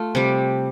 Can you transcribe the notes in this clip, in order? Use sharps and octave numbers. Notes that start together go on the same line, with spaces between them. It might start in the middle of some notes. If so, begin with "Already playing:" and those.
Already playing: A3 F4
C3 G3